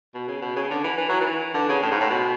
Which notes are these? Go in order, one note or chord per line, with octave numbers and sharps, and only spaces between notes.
B2
C#3
B2
C#3
D3
E3
E3
F#3
E3
D3
C#3
A2
G#2
A2
B2